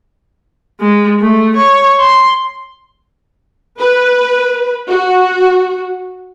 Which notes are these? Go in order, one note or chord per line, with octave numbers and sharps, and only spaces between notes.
G#3
A3
C#5
C6
B4
F#4